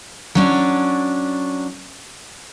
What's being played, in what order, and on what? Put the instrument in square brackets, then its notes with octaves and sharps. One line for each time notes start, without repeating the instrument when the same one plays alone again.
[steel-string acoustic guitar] F#3 C#4 D4